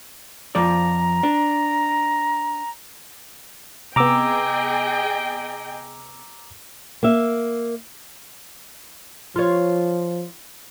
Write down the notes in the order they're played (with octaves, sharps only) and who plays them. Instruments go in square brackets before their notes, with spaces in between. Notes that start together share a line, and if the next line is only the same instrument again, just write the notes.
[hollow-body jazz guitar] F2 F3 D5 [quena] A#5
[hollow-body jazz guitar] D4
[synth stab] C3 B3 [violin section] G#4 D#5 G5 [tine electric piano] A#5 D6 E6
[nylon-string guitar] A#3 E5
[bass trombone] F3 [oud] F4 C#5